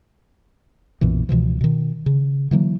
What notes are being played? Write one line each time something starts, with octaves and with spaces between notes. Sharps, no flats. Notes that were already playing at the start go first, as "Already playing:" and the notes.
B1 F#2 A#2 E3
C#2 B2 E3 F3
B2 D#3
C#3
D3 E3 F#3 A#3